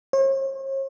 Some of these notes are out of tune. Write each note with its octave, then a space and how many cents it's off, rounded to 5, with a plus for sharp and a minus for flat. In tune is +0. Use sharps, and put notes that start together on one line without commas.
C#5 -45